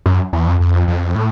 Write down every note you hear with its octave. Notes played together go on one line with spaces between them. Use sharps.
F#2
E2
F2
F2
F2
A2